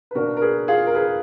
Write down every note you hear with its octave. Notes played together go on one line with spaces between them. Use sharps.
B4
B2 A#3 D4 F#4 A#4
A#4
G#4 B4
F4 G#4
A#4
G#4 B4